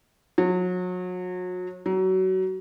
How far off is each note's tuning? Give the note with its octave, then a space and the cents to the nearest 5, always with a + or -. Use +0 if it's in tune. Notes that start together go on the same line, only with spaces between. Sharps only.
F#3 -35
F#3 +25